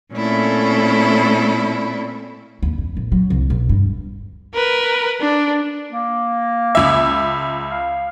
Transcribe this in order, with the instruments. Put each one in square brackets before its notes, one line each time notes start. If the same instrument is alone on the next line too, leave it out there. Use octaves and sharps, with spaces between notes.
[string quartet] A#2 A3 C4 C#4 E4 A4
[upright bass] D#2
F2
A#1
F#3
C2
B1
G2
[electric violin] A#4 B4
D4
[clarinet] A#3
[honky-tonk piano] C#2 E5
[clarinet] F5